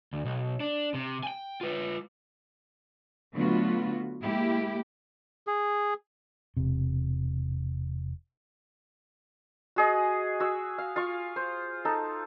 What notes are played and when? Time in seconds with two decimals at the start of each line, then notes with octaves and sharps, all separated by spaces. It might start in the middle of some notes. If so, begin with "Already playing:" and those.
0.13 D2
0.25 B1
0.60 D4
0.94 C3
1.23 G5 G#5
1.61 F4 B4
3.35 D3 F#3 A3 B3 F4 F#4
4.21 G#3 A#3 E4 G4
5.47 G#4
6.57 E1 C3
9.76 F#4 G#4 D#5
10.40 F#4 E6
10.78 F5
10.96 F4 F5 C#6
11.36 C5
11.85 D#4 A4